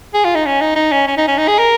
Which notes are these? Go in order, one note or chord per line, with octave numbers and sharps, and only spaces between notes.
G#4
F4
D#4
C#4
D#4
D#4
C#4
C#4
D#4
C#4
D#4
G#4
A#4